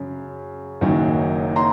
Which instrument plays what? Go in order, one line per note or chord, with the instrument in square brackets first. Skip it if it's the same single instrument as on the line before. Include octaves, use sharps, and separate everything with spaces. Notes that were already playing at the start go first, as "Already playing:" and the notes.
Already playing: [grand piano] F#2 C#3
F#1 F#2 D#3 F#3
A#5 C6